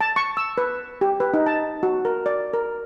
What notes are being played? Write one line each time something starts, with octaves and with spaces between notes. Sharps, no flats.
A5
C#6
E6
B4
G4
B4
D#4
A5
F#4
A#4
D5
A#4